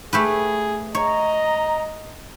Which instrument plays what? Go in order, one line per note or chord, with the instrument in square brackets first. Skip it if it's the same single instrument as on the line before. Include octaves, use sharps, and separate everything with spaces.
[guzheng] A3 G4 B4 [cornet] G#4
[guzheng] C#5 [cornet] D#5 [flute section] A#5